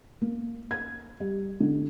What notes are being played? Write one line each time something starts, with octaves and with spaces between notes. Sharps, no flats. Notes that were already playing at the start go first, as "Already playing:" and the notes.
A#3
G#6
G3
D3